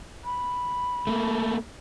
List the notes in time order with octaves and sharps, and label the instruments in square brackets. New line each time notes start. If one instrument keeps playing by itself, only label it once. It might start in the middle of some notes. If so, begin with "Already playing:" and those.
[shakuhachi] B5
[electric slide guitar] A3 A#3